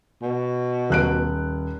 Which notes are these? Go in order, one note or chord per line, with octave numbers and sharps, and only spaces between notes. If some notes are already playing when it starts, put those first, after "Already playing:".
B2
D#1 F#6 D7